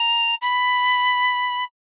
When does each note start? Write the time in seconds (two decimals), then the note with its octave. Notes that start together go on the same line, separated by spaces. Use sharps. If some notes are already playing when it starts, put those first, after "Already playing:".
Already playing: A#5
0.42 B5